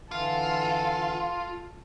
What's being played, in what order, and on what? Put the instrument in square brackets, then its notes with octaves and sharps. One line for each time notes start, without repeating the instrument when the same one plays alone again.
[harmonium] D3 E3 [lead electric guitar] F4 [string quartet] A4